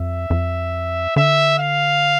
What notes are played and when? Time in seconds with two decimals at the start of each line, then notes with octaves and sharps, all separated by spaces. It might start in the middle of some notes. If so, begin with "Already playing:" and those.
Already playing: F2 E5
0.30 F2
1.16 D3 E5
1.59 F5